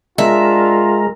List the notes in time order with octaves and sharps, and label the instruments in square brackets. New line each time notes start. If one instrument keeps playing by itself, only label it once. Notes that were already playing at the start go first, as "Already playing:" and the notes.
[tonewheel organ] G#3 A#4 [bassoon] D4 [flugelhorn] F4 [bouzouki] E5